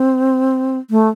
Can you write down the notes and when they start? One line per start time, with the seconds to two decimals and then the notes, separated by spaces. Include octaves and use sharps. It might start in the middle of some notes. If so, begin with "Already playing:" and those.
Already playing: C4
0.90 A3